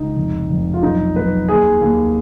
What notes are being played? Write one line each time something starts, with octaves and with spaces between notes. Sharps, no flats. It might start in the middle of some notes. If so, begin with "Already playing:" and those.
Already playing: C#2 D#4
F1
F1
F4
B1 D#4
B1 B4
D#2 G#4
D#2